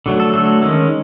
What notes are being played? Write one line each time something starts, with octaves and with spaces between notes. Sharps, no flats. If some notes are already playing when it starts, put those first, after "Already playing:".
D3 F#3 A3
A4
D3 F#3 A3 A4
D#3 G#3 C#4